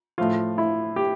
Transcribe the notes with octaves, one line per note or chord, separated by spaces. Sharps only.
A2 F3 F4
E4
G4